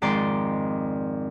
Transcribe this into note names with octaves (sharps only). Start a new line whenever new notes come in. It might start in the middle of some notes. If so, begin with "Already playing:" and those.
F2 G#2 D#3 D5 C6